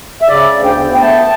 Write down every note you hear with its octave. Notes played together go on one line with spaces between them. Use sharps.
E5
C#3 D5
D2
G5
B3
G5
A3 A5